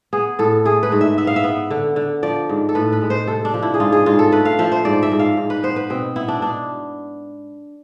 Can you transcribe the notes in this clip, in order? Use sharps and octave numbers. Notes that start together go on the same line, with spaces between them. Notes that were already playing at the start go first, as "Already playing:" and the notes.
B3 G#4
A2 A4
A3 G#4
B4
G#2
E5
B3 E5
F5
E5
B3
D3
D3
F3 D5
G#2
A4
A2 B4
B4
G#3
C5
C3 A4
D4
F3
E4
G#4
G#2 F4
G#4
G#2 F4
A4
A3 B4
F5
F3 E5
C5
G#2 D5
E5
G#2
F5
G#2
B4
B3 C5
B4
B2 C4
B3 E4
D4
B2 D4